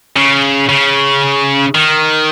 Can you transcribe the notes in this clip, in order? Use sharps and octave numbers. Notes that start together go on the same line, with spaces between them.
C#3
C#3
D#3